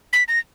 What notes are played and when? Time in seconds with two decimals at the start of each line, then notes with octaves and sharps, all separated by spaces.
0.13 B6
0.28 A#6